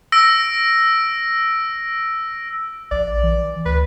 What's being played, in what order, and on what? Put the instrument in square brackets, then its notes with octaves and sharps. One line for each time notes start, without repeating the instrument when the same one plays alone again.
[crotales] E6 A#6 D7
[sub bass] A#1 [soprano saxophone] D5
[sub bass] E3
[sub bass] D2 [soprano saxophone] B4